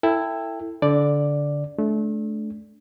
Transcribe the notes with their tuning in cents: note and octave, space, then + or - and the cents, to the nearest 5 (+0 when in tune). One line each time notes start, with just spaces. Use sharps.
E4 +5 A4 +25 G5 +20
D3 -20 D5 +0
A3 -30 D4 -10